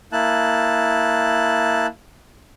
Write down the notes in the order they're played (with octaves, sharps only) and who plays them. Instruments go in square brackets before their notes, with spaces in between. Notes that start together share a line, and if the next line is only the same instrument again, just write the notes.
[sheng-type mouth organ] A#3 E4 A5 F#6